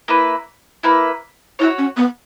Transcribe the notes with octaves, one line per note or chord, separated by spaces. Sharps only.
A#3 E4 B4
A#3 E4 B4
E4 F#4 A#4 C#5
C#4
B3